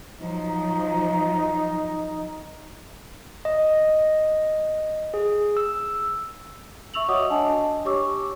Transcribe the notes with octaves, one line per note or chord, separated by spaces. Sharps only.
F3 F#3 D#4
D#5
G#4
E6
E5 C#6 E6 F7 F#7
F#4 C#5 D#5 F#5 D6 D#6
D4 D#5 G#5 A5
G4 C#5 C#6 D6 E6